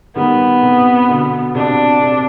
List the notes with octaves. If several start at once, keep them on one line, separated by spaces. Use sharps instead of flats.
D#3 G3 B3
C3
B2 D3
C3 D4
C3